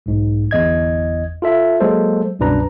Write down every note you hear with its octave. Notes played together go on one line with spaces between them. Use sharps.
B1 G#2
G1 E2 D#5 G#6
F4 A4 E5
F#3 G#3 A#3 A4 C5
C2 F#2 B2 D4 B4 A#5